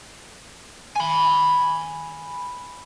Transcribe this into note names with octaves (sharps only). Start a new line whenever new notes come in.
G#5 B5